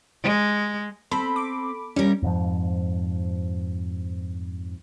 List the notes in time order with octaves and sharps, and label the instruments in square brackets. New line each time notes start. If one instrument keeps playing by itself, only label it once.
[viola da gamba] G#3
[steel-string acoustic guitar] C4 [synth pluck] A4 B5
[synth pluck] D6
[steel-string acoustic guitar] G3 A#4 [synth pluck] C#4
[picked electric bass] F2 G#2 F3